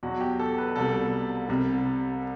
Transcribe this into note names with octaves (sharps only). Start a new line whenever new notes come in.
E2 B2 F#3 F#4
G4
A4
B4
C2 B2 G3 A4
C2 C3 G3